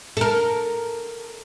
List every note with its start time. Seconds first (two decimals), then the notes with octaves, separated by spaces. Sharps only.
0.17 A4 A#4